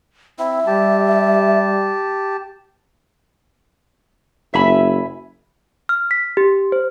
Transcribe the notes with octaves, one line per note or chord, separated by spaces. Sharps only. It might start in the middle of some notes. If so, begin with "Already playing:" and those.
C4 E4 E5
G3 G4 A5
F#1 E5 G#5 B5
F6
B6
G4
C5